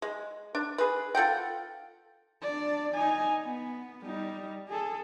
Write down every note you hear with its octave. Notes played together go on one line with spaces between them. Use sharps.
G#3
D4
G#4 B4
F4 A4 F#5 G5
D4 D5
D#4 G#5
B3
G3 D#4
G#4 A4